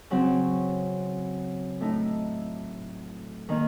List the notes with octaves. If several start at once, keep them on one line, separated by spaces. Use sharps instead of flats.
C#3 F#3 C4
A2 A3 D#4
D#3 A#3